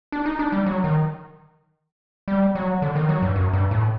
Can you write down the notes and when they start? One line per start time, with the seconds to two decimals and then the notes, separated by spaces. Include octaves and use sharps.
0.12 D4
0.26 D#4
0.39 D4
0.52 G3
0.66 F#3
0.84 D#3
2.28 G3
2.55 F#3
2.82 D3
2.96 D#3
3.09 F#3
3.22 G2
3.36 F#2
3.53 G2
3.71 A2